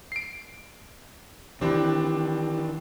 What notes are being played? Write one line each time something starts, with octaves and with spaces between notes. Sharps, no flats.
C7 D7
D#3 E3 C4 D4 E4 G4